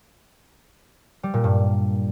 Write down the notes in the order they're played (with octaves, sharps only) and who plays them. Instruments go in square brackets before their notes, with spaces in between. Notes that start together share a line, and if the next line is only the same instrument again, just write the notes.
[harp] G3
A#2
G2